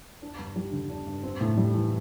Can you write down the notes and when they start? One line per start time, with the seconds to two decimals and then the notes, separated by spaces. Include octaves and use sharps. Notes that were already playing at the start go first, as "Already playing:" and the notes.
0.22 D4
0.39 G2
0.56 G3
0.72 D3
0.90 D4
1.07 G2
1.23 C4
1.41 A2
1.57 G3
1.74 E3